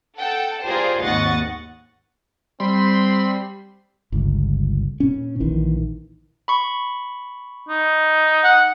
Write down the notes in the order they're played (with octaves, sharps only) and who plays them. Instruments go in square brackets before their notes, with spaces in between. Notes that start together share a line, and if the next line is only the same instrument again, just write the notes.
[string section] A4 F#5 G5 A5
F4 G4 G#4 A#4 C5 D5
G#1 D#2 D#5 F#5 C#6 A6
[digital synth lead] G3 [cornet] C4 [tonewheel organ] B5 C6
[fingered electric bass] G1 C#2
A#2 C#4
A#1 D#3 E3
[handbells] B5 C#6
[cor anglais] D#4
[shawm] F#5